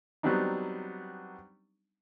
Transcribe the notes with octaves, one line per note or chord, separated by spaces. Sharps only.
F#3 G3 B3 C4 D4 D#4